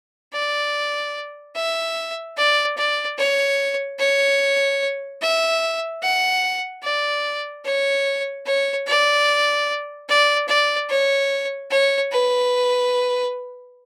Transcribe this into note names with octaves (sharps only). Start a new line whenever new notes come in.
D5
E5
D5
D5
C#5
C#5
E5
F#5
D5
C#5
C#5
D5
D5
D5
C#5
C#5
B4